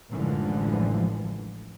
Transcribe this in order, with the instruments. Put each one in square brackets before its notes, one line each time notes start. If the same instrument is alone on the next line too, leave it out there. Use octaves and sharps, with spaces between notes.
[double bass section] A1 F#2 D3 E3 F3 G#3